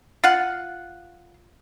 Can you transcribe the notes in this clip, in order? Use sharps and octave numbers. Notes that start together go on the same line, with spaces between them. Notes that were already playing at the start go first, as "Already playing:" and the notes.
F4 F5 F#5